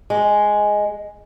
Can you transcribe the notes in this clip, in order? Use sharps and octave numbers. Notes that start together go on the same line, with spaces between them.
G#3